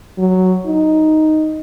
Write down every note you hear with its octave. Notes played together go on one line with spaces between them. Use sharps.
F#3
D#4